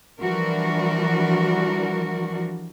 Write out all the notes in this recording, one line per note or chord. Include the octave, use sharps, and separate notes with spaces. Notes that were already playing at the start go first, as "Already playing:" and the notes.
E3 F3 G3 D4 F#4 A#4